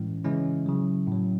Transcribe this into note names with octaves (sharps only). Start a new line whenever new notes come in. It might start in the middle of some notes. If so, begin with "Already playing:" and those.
Already playing: A2 E3 G#3 C#4 E4
C#3 E3 G#3 C#4 E4
C#3 F#3
A2 F#3